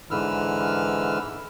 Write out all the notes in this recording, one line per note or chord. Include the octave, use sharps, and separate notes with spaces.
G#2 D3 E3 B4 E6 F6